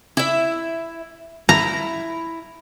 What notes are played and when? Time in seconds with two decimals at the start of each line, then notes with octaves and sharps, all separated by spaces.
0.17 E4 E5
1.49 E4 A#5